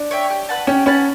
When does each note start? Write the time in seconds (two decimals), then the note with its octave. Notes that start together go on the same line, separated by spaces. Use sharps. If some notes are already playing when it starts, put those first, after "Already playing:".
Already playing: D4
0.11 C#5 E5 G5
0.30 G4
0.49 B4 F#5 A5
0.67 C#4 G4
0.86 C#4 B4 F#5 A5